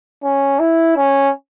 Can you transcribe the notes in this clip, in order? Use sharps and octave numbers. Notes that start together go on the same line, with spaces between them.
C#4
E4
C#4